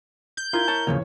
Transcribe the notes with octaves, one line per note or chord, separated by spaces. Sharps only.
G6
E4 F4 A#4 G#6
C#5 A5
D1 E2 C#3 F3 A#3 C#5